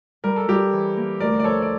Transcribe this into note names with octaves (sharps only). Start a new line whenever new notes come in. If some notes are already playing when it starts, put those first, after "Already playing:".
G3 A#4
A4
G3 G4 A#4
E3
A#3
D2 A#4 D5
D5
F3 A4 C#5
D5